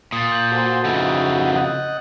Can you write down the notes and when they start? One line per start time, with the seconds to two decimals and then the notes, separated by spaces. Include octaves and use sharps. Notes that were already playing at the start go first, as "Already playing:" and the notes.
0.12 A#2 D#6 A6
0.32 G6 F#7
0.51 F#4 A4 C5
0.85 F2 C#3 B3 D#4 E4
1.56 D#5 F#5